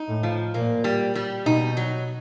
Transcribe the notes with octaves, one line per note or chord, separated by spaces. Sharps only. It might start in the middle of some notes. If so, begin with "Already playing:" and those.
Already playing: D#4
A2
F3
A#2 A#3
G3
G3
B2 D#4
F#3